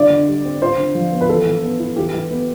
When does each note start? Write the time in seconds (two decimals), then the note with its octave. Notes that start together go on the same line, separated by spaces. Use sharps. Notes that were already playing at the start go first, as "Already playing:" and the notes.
Already playing: D3 D5
0.10 D3
0.28 G3
0.45 C4
0.62 F4 C5
0.78 D3
0.95 F3
1.12 B3
1.21 B4
1.29 E3 A4
1.46 E3
1.63 B3
1.79 E4
1.96 E3 G4
2.14 E3
2.31 B3